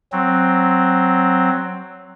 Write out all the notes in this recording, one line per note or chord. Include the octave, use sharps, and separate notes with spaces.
F#3 C4